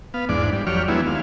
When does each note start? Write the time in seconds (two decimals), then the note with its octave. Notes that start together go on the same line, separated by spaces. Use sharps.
0.14 B3 F5
0.29 E2 G#2 D4 D5
0.53 G3
0.67 F2 F#3 G4 C#5 D5 F6
0.88 E3 F#3 G#3 B3 D4 E4
1.06 D#2 G#3 F5